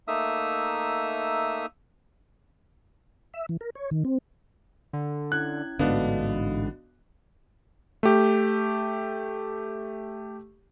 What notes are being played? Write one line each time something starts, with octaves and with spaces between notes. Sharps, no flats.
A3 A#3 D#4 E5 D#6 E6
E5
E3
A#4
C#5
D#3
C4
D3
C#4 E4 F#6 G#6
A1 G#2 D3 B3 D4 F#4 D#5 F5
A3 G4